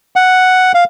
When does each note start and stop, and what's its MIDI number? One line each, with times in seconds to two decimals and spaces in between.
0.16 0.72 78
0.74 0.84 77